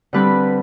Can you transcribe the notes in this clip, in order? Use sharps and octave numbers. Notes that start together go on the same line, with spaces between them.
D3 G3 C4 B4 B5